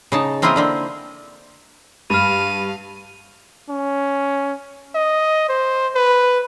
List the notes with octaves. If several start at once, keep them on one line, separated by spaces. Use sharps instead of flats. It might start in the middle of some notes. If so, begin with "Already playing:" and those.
C#3 D#4 A5
A#3 C4 E4 F4 A#4 D#5
D3 A#3 C4
G2 F5 B5 F6 D#7 F7
C#4
D#5
C5
B4